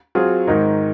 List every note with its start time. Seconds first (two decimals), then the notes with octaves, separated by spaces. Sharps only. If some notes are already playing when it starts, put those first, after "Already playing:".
0.15 F#3 C4 F4 G#4
0.47 G#2 D#3 G#3 D#4 A#4